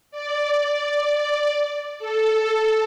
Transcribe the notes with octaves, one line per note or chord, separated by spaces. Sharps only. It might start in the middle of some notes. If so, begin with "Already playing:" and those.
D5
A4